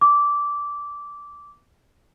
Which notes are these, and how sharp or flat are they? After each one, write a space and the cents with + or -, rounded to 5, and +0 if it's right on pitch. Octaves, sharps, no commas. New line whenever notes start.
D6 -15